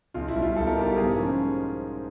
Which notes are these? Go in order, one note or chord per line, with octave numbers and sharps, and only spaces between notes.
B1 F4
E4
B2 G3
F4
B1 A4
A#4
B2 G3 G4 A4
G#2 G#4 A#4
F3 A#3 C#4